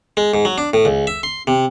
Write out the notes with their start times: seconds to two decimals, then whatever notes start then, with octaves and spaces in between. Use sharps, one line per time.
0.17 G#3
0.34 G#2
0.45 F#3
0.58 D4
0.74 A2
0.85 C#2
1.07 E5
1.23 C6
1.47 C3